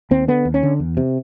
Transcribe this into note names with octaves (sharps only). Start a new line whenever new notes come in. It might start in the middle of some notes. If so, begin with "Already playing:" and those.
D#2 C4
D3 B3
D#2
C#4
D3
E2
C3